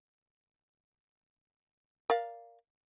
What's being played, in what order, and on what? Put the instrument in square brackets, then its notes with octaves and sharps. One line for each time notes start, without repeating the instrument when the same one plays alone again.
[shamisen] A#4 D5 F5